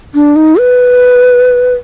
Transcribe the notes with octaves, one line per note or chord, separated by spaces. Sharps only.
D4
D#4
B4